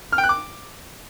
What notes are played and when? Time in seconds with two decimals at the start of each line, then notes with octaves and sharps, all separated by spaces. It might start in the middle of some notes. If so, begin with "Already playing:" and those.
0.12 F6
0.18 G5
0.24 F#6
0.29 D6